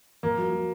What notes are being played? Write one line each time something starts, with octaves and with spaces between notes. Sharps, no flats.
F2 A#3
F#3
F#3